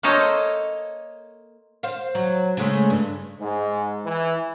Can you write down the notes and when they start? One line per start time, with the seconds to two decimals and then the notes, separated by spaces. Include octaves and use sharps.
0.03 A#3 A4 C5 C#5 D#5
1.83 C5 F5
2.15 F#3
2.57 C#3 G#3 A3
2.90 G2
3.40 G#2
4.05 E3